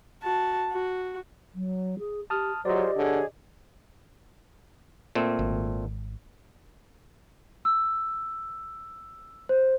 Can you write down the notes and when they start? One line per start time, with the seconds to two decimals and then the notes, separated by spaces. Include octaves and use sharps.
0.22 F#4 A5
0.71 F#4
1.54 F#3
1.99 G#4
2.30 G4 A5 D#6 F6
2.65 F#3 F4 G4 G#4 C5 D5 D#5
2.96 D3 G#4 C#5
5.15 A#2 A3 C4
5.39 G#1
7.65 E6
9.49 C5